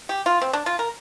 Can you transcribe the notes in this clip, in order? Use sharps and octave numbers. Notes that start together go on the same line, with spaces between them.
G4
F4
C4
D4
F4
A#4